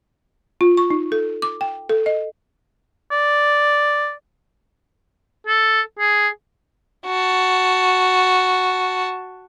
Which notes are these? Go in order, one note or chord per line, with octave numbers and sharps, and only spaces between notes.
F4
C#6
D#4
A4
D6
G5
A4
D#5
D5
A4
G#4
F#4 A5